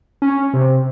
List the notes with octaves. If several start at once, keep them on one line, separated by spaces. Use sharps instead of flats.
C#4
C3